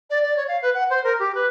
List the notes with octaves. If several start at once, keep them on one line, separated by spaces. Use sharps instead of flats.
D5
D5
C#5
F5
B4
F#5
C5
A#4
G4
B4